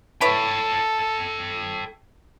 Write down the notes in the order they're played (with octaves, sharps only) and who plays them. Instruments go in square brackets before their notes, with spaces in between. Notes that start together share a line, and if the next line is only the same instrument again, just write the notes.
[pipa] E4 B4 C#5 [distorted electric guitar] A4 G5 [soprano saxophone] A5